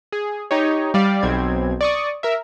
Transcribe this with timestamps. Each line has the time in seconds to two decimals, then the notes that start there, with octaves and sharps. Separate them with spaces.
0.12 G#4
0.51 D#4 G4 C#5
0.94 G3 D5 F5
1.23 B1 B2 C4 G#6
1.81 D5 C#6 D#6
2.23 A#4 E5